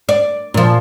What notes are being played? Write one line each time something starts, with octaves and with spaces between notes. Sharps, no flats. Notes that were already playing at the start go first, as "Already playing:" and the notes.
D5
A#2 F3